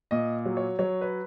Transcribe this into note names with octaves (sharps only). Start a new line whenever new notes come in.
A#2 D#5
F#3
C#5
F#3 C#5
B4